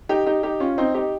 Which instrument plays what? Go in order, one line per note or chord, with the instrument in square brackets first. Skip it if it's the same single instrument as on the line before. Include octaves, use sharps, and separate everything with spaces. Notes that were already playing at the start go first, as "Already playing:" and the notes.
[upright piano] D#4 G4
D#4 G4
D#4 G4
C#4 F4
C4 D#4
D#4 G4